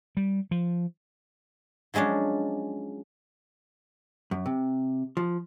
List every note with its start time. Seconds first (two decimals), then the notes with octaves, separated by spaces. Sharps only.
0.17 G3
0.51 F3
1.94 F3 F#3 G#3 C#4 D4
4.31 F#2
4.46 C3
5.17 F3